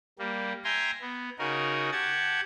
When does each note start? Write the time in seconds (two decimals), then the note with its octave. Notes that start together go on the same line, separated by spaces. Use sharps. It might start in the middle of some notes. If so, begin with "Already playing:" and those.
0.19 G3 A#3
0.64 E5 G5 G#5 A#5 C6
1.01 B3
1.39 C#3 D#4 F#4 A#4
1.92 G4 F#5 A5 G#6